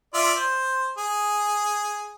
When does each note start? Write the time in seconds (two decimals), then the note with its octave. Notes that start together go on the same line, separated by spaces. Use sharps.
0.14 F4 D5 E5
0.36 C5
0.98 G#4